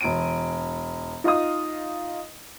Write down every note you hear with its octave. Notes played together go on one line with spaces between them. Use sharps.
E1 D7 D#7
D#4 F4 D#5 F5 D#6